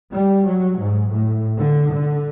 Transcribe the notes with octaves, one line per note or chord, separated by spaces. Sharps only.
G3
F#3
G#2
A2
D3
D3